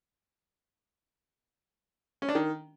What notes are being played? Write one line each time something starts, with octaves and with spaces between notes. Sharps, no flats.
C#4
D4
D#3